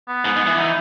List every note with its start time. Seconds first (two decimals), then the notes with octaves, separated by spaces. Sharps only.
0.08 B3
0.25 G#2
0.36 G#2
0.47 E3
0.58 D#4